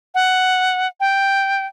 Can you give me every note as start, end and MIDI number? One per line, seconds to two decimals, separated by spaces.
0.15 0.87 78
1.00 1.66 79